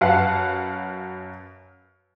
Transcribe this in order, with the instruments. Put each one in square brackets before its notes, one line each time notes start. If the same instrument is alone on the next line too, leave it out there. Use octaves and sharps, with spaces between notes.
[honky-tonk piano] F#2 B4 F5 F#5 A5